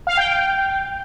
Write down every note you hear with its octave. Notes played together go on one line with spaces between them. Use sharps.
F5
G5
G5